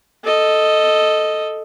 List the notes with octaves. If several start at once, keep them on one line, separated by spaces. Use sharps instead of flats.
A4 D#5